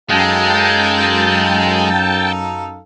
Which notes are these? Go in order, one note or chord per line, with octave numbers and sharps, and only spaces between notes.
F#2 G#3 D#4 A4 F5 G5 A5